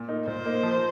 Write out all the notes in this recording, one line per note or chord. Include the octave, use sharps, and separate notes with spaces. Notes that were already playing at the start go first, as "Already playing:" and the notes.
Already playing: A#2
A#3 D#4
A#2 C5
A#3 D#4
F3